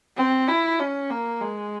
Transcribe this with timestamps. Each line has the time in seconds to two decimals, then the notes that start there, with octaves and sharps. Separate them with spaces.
0.17 C4
0.48 E4
0.79 C#4
1.10 A#3
1.41 G#3